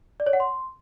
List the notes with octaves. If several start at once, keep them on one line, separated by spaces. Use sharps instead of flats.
D5
C#5
F#5
C6